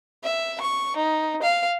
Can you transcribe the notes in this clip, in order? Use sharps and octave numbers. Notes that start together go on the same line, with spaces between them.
E5
C#6
D#4
F5